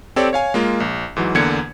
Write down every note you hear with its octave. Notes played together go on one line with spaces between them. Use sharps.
C4 G4 A4 C#5 D5
C#5 F5 G#5
G#3 A#3 F4
A#1
G#2 E3 F#3
E2 D3 A#3 G#6 C#7